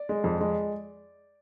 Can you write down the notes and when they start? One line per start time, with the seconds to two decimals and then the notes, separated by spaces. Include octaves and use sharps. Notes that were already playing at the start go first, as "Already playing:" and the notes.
Already playing: D5
0.09 G#3
0.24 F2
0.41 G#3